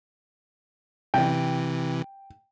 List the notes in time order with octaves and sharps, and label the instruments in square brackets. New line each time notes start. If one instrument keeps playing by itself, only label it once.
[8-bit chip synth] C3 E3 [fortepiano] G5